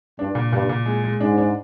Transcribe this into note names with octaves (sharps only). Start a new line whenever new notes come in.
G2 D4
A#2
G2 A#2
A#2
G#3
G#3
G#2 D4
D4